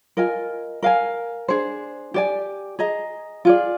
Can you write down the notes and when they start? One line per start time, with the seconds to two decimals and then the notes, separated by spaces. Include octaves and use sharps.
0.17 F4 A#4 D#5 G#5
0.83 A#4 F5 G#5
1.48 D4 G#4 C5
2.14 G4 D5 G#5
2.79 G#4 D#5 A#5
3.45 F4 G#4 D5